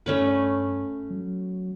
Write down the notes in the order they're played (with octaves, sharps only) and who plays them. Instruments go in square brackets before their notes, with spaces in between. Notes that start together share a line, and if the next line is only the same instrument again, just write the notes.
[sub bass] G2 [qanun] A3 C#4 B4
[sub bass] F#3